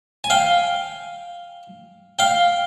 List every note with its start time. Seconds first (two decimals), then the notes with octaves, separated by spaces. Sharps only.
0.24 G#5
0.30 F5 G5
2.19 F5 G5